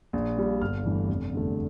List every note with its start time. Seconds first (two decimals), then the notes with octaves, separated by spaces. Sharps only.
0.13 A#1
0.37 A#2 G3
0.61 G1 F6
0.85 G2 E3 A3
1.08 F1
1.33 E2 D3 A3